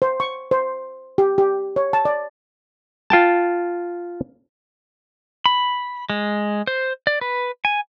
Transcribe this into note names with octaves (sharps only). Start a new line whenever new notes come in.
C5
C#6
C5
G4
G4
C#5
A5
D5
F4 G5 A5
B5
G#3
C5
D5
B4
G#5